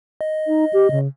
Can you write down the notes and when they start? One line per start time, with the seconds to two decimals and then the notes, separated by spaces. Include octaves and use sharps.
0.21 D#5
0.47 D#4
0.73 G4
0.91 C#3